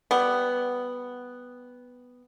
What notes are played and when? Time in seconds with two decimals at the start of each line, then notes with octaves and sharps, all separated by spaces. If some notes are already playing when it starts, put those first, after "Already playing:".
0.11 G3 B3